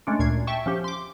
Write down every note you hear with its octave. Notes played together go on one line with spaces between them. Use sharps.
G#3 A3 C#4 D4
D2 A#2 G#6 C7
E5 G5 A5 C#6
F3 C#4 G4
C6 D6